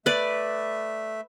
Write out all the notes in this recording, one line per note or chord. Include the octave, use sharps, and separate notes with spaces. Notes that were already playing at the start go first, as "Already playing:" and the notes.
A3 B4 D5 E5